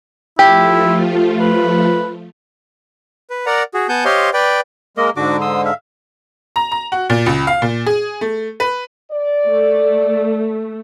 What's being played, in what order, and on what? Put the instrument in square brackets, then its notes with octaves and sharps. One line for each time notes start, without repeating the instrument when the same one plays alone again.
[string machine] F3 A3 F4 [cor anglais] E4 [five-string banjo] G4
[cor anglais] B4
[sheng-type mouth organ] B4
A#4 D5 F#5 A#5
F#4 G#4
B3 F#5 G#5 A5 G6
G4 C5 C#5 D#5 F5 C6
B4 D5 G5
[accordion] G#3 A#4 [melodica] A#3 D#5
[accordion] G#2 D3 [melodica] D4 F#4 D6
[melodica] C6 D#6 E6
E5 F5
[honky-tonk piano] A#5
A#5
F#4
A#2
C#2
F5
A#2
G#4
A3
B4
[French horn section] D5
[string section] A3